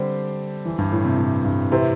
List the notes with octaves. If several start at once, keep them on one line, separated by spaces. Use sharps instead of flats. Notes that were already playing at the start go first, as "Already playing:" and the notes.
Already playing: D3 G3 C4 G4 C5
E3
G2
A2
C3
A2
G2
A2 C3 E3 C4